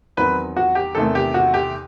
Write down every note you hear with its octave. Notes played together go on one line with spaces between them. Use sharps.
E2 D#3 F#3 C4 B4
F#4
G4
E2 C3 D#3 A3 A4
G4
F#4
G4